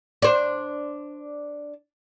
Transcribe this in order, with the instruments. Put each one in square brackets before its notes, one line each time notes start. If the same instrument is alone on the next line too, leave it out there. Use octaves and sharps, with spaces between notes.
[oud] D4 C5